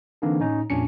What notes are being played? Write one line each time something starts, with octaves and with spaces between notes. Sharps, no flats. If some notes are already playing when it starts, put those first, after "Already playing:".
D3 E3 A#3 C4 D4 D#4
A2 C#4 D#4
F2 A#2 C#4 D4 C#7